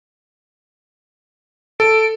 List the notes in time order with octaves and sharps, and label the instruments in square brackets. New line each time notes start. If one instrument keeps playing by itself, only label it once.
[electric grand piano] A4 [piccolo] D7